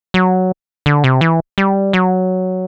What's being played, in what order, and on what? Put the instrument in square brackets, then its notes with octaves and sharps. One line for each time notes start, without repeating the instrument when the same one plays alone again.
[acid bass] F#3
D3
C3
E3
G3
F#3